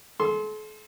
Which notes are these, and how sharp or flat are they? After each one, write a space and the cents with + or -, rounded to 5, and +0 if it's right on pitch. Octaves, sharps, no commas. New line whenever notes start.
A4 -45 C6 +0